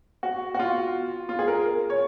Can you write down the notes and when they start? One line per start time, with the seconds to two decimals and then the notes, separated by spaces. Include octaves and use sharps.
0.23 F#4
0.54 F#4
0.59 F4
1.29 F4
1.39 G#4
1.48 A#4
1.90 C#5